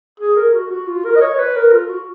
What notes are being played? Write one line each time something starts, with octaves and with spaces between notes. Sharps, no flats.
G#4
A#4
F#4
F#4
F4
A#4
D#5
C#5
C#5
B4
A#4
F4
F#4